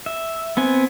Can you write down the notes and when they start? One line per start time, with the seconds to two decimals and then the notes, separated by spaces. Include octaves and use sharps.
0.06 E5
0.57 B3 C4 G#5